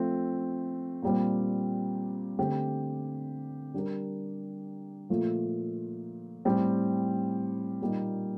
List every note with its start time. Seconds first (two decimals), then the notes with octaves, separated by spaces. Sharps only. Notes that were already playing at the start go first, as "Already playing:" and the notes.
Already playing: F3 A3 C4
1.02 A#2 G3 C4
2.39 D3 A3 C4 G4
3.74 G3 D4 G4 A#4
5.09 A#2 F3 A3
6.45 A2 G3 C4
7.80 A#2 G3 A#3 D#4